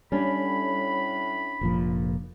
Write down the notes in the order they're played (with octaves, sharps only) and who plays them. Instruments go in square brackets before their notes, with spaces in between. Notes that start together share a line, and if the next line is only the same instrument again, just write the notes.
[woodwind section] A2 B5 [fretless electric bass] G3 [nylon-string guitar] C#4 D4
[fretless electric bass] F1 A#2 F3